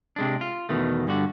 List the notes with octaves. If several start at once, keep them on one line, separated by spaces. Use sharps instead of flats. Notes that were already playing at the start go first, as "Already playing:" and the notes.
C3 G#3 D4
F4
E2 B2 D#3 A3
G2 D3 F#4